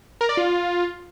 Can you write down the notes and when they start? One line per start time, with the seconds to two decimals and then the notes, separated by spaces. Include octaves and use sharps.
0.21 A#4
0.29 D5
0.37 F4